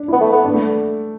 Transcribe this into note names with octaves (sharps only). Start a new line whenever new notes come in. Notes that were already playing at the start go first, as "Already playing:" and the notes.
Already playing: D4
B3 E4
A3
B3
D4
A3